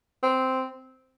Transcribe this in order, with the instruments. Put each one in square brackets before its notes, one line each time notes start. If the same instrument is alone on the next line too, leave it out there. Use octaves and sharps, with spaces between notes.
[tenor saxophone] C4